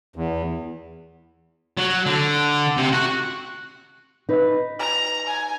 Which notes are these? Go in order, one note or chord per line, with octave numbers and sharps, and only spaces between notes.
E2
F#3
D3
C3
F#4
D#4 B4
A#5
G#5